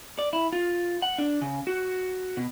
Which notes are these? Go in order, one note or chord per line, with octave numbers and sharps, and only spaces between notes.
D5
E4
F4
F#5
D4
C#3
F#4
B2